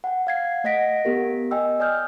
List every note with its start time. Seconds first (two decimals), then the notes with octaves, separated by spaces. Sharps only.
0.04 F#5 G5
0.27 F5 G#6 C7
0.64 A3 D#5 F#5 A#6 B6 D7
1.05 B3 G4 A#4
1.51 D#5 G5 G#5 E6
1.80 D5 G#5 D#6 F6 G6